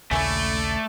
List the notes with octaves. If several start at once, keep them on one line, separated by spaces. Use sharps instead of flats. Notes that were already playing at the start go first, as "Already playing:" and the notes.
A#1 D#2 C#3 A3 C#4 E4 D5